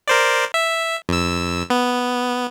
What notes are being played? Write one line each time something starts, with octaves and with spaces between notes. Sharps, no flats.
A#4 C5 D5
E5
F2 E6
B3